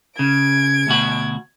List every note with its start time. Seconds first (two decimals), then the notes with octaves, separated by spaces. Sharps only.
0.19 C#3 G#6 D7
0.87 D2 B2 F#4